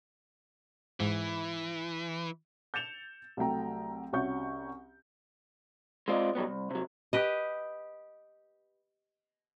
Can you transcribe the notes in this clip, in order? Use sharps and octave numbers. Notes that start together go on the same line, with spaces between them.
G#2 E3
G6 A6 C#7 E7 F7 G7
C2 F#3 A3 G5 A#5
C2 C#4 F#4 C#6 G6
G#3 C4 F4 D5 D#5
B2 F#3 G3 B3
C2
C3 F#3
G4 B4 D#5